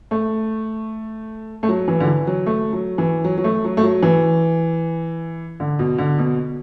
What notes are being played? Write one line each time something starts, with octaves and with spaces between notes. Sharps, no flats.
A3
A3
F#3
E3
D3
E3
F#3
A3
F#3
E3
F#3
F#3
A3
F#3
A3
F#3
E3
D3
B2
D3
B2